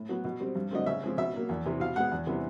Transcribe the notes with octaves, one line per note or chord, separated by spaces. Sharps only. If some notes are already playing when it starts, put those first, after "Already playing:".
Already playing: A2
F#3 B3
B2
G3 C4
G2
D3 F#3 A3 C4 D#5
C#3 E5
F3 G#3 C4
B2 E5
F#3 A#3
E2
C3 E3
B2 F5
G#3 B3 F#5
E2
C3 E3 G3 B3